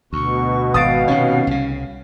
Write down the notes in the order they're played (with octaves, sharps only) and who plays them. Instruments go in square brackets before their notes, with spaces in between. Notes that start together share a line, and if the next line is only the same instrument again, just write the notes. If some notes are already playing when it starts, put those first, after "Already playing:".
[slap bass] D2 [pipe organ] B2 [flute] C#6
[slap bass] G#1 [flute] F5 [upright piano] D#6 A6 D7
[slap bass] C3 D#3 [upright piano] C#4
[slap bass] C2 C#3